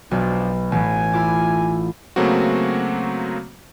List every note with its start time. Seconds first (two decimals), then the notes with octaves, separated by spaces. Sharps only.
0.11 B1 F3 D4
0.72 A1 G#5
1.13 E4 F4 D6
2.16 C#3 F#3 A3 A#3 C4 F#4